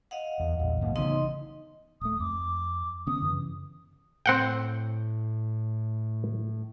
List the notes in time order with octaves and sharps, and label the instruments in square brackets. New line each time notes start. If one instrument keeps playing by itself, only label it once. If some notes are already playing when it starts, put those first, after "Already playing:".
[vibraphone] D#5 F5 F#5
[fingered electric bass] E2
A#1 E2
G#2 D3 A#3
[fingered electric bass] C#3 E3 B3 [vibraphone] D#4 D#5 C6
[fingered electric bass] D1 A3 [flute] D#6
[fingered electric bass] F2 [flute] D6
[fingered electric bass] D3 B3 C#4 [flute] D#6
[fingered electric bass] F#2 C#3 E3
[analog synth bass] A2 [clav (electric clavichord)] C4 F#5 G5